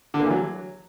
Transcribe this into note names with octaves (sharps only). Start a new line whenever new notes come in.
D3
A#3
E3
F#3